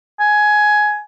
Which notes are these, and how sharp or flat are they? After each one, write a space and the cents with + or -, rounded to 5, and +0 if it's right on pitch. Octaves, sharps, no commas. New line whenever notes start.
G#5 +15